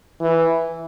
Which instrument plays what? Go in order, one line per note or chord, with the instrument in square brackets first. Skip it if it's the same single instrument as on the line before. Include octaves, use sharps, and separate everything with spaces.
[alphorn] E3